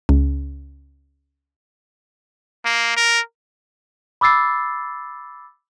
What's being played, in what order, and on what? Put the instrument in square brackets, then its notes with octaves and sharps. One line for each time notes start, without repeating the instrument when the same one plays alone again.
[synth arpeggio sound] C#2
[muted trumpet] A#3
A#4
[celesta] B5 D6 E6 A6 C7